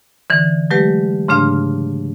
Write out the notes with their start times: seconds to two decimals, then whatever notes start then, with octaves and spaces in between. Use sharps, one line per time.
0.30 D3 E3
0.71 F#3 G#3 A3 G4 B4
1.28 G#2 C#3 A3 D4 F5 F6